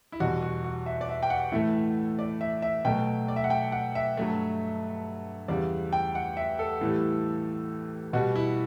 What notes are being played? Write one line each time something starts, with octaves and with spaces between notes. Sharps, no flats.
E4
E2 B2 G3 F#4
F#4
F#4
E5
D5
E5
G5
F#5
A2 E3 A3 E5
D5
E5
E5
B2 F#3 A3 G5
D5
E5
F#5
G5
F#5
E5
G2 F#3 A3
E2 C#3 G3 D5
G5
F#5
E5
A4
A2 E3 G3
B2 G3 F#4
E4